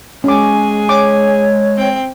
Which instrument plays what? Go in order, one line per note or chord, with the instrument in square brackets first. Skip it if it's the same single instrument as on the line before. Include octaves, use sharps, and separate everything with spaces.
[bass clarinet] G#3 [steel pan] C#4 D6 [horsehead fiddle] G#4 G#5
[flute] C#5 [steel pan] D6
[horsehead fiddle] C4 G5